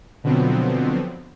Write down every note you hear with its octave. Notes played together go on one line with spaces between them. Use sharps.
B2 D3 F3 F#3 B3 C4